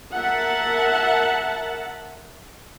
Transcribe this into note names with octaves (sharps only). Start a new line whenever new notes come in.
A#4 E5 F#5 A5